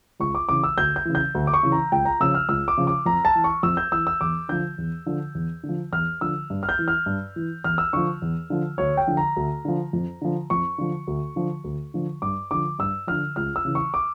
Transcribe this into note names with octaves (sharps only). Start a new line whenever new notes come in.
C#2 C#6
D6
C#3 E3 D6
E6
D2 G6
G6
C#3 E3
G6
D2
D6
C#6
C#3 E3
A#5
C#2 G5
A#5
C#3 F3 E6
F6
C#2 E6
D6
C#3 F3
D6
F2 A#5
A5
E3
C#6
F2 E6
G6
E3 E6
E6
E2 D6
D3 F3 G6
E2
D3 F3
E2
D3
F3
E2 F6
D3 F3 E6
G2
F6
G6
E3
F6
G2
E3
E2 F6
E6
D3 F3 C#6
E2
D3 F3
D2 C#5
G5
D3 F3
A#5
D2
D3 F3
F2
D3 F3
F2 C#6
D3 F3
D2
D3 F3
D2
D3 F3
G2 D6
D3 F3 D6
G2 E6
D3 F3 F6
C#2 F6
E6
C#3 E3
C#6
D6